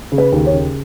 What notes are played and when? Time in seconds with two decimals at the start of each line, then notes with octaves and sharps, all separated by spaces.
0.12 C#3
0.18 B4
0.32 D#2
0.46 C#5
0.53 C#3